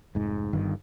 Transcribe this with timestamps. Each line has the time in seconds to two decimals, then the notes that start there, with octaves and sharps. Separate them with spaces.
0.15 F1 G#2
0.53 G1 G2 D#3